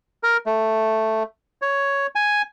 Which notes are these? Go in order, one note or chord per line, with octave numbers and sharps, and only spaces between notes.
A#4
A3
C#5
G#5